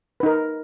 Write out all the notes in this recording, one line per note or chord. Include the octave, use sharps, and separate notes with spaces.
D#4 A#4 B4